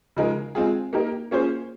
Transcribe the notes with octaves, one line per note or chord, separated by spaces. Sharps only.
C#3 F3 G#3 D#4 A#4
G#3 C4 F4 G#4
A#3 D#4 G4 A#4
A#3 C#4 F4 G#4 C5